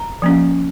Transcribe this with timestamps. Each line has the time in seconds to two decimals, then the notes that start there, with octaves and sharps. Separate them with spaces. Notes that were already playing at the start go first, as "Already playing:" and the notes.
Already playing: A#5
0.22 F3 A#3 C#4